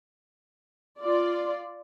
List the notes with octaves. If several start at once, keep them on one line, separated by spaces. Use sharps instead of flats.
F4 D5